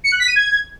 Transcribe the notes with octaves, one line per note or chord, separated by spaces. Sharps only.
C#7
F#6
B6
D#7
G#6